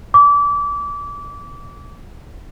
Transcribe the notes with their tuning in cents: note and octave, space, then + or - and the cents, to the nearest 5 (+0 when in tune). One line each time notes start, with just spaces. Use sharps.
D6 -30